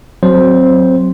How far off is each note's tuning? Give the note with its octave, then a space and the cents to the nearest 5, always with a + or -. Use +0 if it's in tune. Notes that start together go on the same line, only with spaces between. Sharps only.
F#3 +0 C4 +5 C5 +0